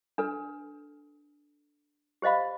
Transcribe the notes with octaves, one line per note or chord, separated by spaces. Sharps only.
D4 A4 B4
G4 C5 D#5 F5 B5